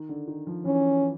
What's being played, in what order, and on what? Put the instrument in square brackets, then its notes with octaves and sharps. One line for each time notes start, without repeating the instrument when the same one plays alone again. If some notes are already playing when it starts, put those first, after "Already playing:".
Already playing: [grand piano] D#3
D3
D#3
F3
[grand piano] E3 [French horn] C#4